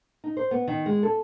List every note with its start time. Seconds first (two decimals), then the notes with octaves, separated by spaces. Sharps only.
0.24 D#4
0.37 C5
0.51 B3
0.67 D#3
0.86 G#3
1.03 A4